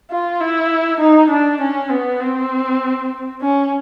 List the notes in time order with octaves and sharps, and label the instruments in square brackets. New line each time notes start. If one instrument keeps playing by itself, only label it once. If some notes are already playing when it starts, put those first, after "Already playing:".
[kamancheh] F4
E4
D#4
D4
C#4
B3
C4
C#4